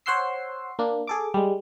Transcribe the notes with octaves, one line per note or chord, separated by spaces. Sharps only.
C5 C#5 F#5 C6 E6 C7
A#3 D4
G#4 A4 D6
G3 G#3